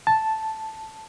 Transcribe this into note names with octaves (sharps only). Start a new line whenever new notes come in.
A5